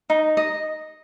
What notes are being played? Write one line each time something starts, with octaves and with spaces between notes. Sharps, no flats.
D#4
D#5